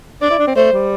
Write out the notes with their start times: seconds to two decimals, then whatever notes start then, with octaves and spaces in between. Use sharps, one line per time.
0.22 D4 D5
0.30 E4
0.39 D4
0.47 C4
0.56 A3 C5
0.72 G3